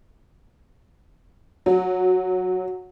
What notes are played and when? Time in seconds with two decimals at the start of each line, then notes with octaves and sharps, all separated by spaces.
1.66 F#3